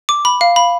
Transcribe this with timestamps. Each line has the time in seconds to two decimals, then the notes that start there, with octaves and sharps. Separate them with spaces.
0.09 D6
0.25 B5
0.41 F5
0.56 B5